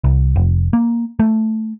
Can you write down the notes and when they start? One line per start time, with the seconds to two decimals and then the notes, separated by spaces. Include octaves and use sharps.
0.04 C2
0.36 F1
0.73 A#3
1.19 A3